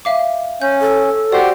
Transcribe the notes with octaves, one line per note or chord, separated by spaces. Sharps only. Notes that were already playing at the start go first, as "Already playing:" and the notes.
E5 F5 D6
C#4 G6
A4
F#4 G4 C5 D5